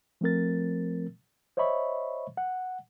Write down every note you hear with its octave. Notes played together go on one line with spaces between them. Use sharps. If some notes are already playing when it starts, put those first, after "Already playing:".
F3 A3 C4 A#4 A6
C5 C#5 D#5 E5 B5 C#6
F#5